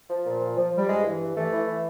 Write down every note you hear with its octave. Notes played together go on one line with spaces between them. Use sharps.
F3
A#2
F3
F3
F3 G3
G2 G#3
E3
G2
E3 A3
E3
E3